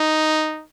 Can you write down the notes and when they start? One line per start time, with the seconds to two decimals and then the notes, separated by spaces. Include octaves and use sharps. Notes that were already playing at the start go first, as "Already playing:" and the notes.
Already playing: D#4